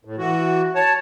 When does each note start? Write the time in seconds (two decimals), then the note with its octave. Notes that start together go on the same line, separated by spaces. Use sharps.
0.05 A2
0.18 E3 F#4
0.75 C#5 A5